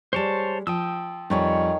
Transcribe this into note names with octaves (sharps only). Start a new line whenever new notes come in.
G3 G#3 C5 C#5 A5
F3 G5 D#6 E6
F2 D#3 G3 C#5 G#5